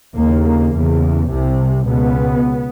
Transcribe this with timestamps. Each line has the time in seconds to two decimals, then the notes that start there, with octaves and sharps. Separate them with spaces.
0.16 D#2 C#3 A#3
0.44 A#3
0.73 E2 C#3
1.29 C2 C3
1.86 C#2 B2 B3